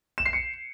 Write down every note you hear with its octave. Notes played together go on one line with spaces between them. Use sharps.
E7
C7
C#7